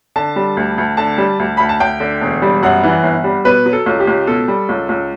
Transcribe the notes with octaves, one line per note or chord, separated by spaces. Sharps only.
D3 A5
G3
D2
D2
D3 A5
G3
D2
D2 B5
A5
D2 G5
D3
E1
G3
F#2 F#5
E3
G1
G3
B2 B4
F#3
A4
C#2
G4
C#2
B2 A4
G3
C#2
C#2